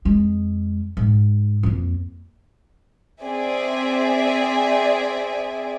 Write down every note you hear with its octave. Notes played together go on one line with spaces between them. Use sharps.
F2 G#3
G#2
F2 A#3
C4 G#4 D5 E5 G#5